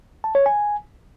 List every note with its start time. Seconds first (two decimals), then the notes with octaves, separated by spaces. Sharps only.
0.24 A5
0.35 C#5
0.46 G#5